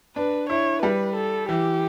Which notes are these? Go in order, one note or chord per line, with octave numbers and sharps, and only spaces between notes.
D4 B4
E4 C#5
G3 B4
A4
E3 G4